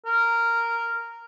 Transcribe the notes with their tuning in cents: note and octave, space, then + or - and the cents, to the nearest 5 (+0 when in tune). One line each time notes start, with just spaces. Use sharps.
A#4 -10